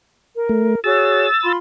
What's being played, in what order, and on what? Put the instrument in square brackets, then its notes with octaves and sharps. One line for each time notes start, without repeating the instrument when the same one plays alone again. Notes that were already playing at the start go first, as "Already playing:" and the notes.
[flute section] A#4
[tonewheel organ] A3
[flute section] F#4 G#4 C#5 [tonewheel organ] E6 A6
[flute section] F4 B5 C6